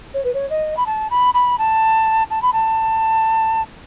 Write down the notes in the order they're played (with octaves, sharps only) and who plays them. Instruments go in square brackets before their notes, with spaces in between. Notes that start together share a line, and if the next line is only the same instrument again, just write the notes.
[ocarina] C#5
B4
C#5
D#5
B5
A5
B5
B5
A5
A5
B5
A5